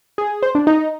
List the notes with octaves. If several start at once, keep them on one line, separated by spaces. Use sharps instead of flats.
G#4
C5
D4
D#4